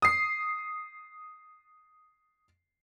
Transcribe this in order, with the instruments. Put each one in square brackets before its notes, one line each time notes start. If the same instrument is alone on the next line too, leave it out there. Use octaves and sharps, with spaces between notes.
[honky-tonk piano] D#6 C7